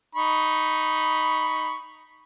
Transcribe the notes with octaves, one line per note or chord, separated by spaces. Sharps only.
D#4 B5 C#6